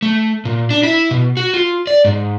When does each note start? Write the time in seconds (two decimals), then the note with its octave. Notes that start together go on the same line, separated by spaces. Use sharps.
0.02 A3
0.45 A#2
0.70 D4
0.83 E4
1.11 B2
1.37 F#4
1.54 F4
1.87 D5
2.05 G#2